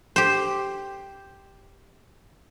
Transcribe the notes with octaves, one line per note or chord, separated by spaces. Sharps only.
G4 C5